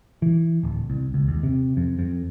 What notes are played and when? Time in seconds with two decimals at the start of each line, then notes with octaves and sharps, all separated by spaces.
0.22 E3
0.63 D1
0.90 C2
1.14 C#2
1.28 D#2
1.43 C3
1.77 F2
1.99 F2